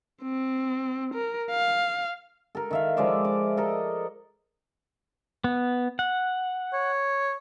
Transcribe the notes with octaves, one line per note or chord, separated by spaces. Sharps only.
C4
A#4
F5
A4 A#4
D#3 E5 F5
F3 G#3 D5 E5
D6
A4 A#4 D#5
B3
F#5
C#5